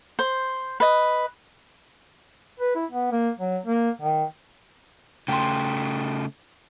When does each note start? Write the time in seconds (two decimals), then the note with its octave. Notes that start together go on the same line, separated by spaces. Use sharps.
0.19 C5
0.80 B4 D#5
2.59 B4
2.75 E4
2.91 B3
3.12 A#3
3.39 F#3
3.66 A#3
4.01 D#3
5.28 C#3 A3 G5 C6